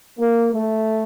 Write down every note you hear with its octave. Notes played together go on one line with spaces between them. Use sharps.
A#3
A3